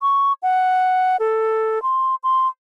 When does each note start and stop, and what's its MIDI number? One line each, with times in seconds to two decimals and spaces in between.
0.02 0.33 85
0.43 1.17 78
1.20 1.82 69
1.83 2.15 84
2.23 2.48 84